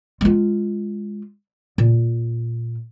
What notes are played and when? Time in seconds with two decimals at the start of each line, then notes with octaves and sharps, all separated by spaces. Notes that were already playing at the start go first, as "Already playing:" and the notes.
0.21 G#3 F4
1.78 A#2